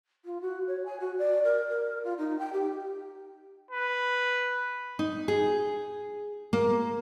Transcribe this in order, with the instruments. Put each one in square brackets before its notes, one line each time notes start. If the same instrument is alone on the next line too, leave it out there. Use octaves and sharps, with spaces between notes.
[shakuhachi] F4
F#4
C#5
G#5
F#4
D5
A#4
A#4
F4
D#4
G5
G4
[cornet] B4
[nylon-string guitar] D#4
G#4
A#3